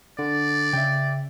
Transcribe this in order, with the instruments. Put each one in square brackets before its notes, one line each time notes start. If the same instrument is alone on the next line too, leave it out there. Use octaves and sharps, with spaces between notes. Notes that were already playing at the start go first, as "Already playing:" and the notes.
[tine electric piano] D3 [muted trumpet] D5
[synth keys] C#3 E5 [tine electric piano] G5